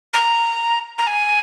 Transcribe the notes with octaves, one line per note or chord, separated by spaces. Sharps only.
A#5
A#5
G#5